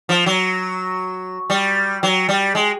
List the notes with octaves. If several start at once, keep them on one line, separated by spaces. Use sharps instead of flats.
F3
F#3
G3
F#3
G3
G#3